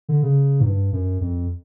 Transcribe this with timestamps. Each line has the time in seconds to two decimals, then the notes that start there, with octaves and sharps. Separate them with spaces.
0.09 D3
0.23 C#3
0.60 G#2
0.65 G2
0.93 F#2
1.21 F2